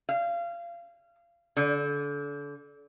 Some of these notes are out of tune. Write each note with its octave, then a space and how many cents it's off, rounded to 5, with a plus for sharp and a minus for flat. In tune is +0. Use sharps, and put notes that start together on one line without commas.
F5 -25
D3 -30